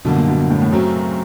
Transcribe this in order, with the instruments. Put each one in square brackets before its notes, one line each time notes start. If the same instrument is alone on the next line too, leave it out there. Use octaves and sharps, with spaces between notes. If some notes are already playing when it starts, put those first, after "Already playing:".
[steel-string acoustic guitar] F#2 D3 G3 A#3 [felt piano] B2
[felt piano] A#2
B2
A#2
A2
A2
[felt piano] F#2 [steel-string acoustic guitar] C#3 F#3 A3 C4